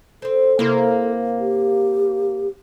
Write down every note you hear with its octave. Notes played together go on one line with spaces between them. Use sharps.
C4 A4 C5
C3 A#3 E4 C5
G4